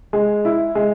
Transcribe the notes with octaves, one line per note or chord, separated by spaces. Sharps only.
G#3
E4
G#3